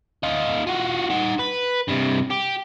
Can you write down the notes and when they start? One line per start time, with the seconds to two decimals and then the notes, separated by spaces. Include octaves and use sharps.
0.23 D#4 F4
0.67 F4 F#4
1.10 D#4 F#5
1.39 B4
1.89 G2 C3
2.31 G4